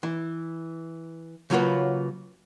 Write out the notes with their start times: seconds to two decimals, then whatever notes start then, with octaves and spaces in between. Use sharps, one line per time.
0.03 E3
1.50 C#3 F#3 A#3 F4 F#4 B4